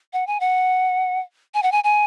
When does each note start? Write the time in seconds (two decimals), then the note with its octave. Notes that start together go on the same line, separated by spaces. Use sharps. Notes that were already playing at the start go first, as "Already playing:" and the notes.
0.13 F#5
0.27 G#5
0.40 F#5
1.54 G#5
1.63 F#5
1.72 G#5
1.84 G#5